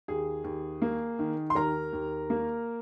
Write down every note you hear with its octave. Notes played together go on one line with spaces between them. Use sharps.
D#2 G#4
D#2
A#3
D#3
C6
D#2 A#4 A#5
D#2
A#3